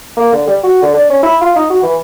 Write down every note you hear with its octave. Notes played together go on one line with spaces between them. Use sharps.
A#3
D3
G3
F#4
D3
D4
C#4
E4
F4
D#4
F#4
E3